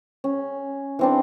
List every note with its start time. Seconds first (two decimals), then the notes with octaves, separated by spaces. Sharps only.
0.24 C#4
0.99 E3 C4 D4